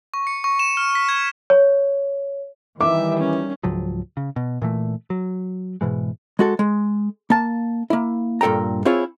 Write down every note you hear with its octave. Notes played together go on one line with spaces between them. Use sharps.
C#6
C#7
C#6
E7
F6
B6
G#6
C#5
D#3 E3 G3 E5 D6
C#4
C#2 G#2 F3 F#3
C#3
B2
A#2 E3 A3
F#3
G#2 B2 E3 G#3
G#3 F#4 A4
G#3
A#3 A5
A#3 E4
G2 A#2 A4 G5 A#5
C4 E4 F4 G#4 C#5